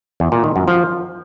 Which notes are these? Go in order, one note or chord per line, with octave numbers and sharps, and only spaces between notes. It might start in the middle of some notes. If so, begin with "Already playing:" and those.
E2
A#2
D#3
F#2
F3